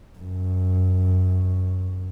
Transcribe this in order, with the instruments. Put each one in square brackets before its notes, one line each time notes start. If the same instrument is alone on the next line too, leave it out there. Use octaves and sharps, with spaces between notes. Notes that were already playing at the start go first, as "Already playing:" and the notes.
[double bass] F#2